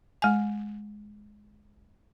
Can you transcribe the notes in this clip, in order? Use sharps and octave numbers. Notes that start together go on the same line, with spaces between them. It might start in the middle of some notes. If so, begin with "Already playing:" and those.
G#3 G#5